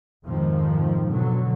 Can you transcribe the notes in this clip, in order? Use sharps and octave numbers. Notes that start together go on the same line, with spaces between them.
F2 G#2 C3 D#3 F3
B2 D3 F#3